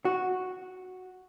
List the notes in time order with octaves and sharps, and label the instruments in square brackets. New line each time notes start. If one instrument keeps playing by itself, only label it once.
[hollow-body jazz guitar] F#4